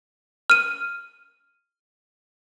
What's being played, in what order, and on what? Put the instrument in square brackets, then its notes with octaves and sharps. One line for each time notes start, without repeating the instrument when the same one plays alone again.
[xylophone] F6 D#7